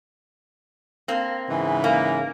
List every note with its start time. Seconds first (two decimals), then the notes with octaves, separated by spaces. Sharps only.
1.08 A#3 C4
1.49 G#2 C#3 E3
1.84 A#3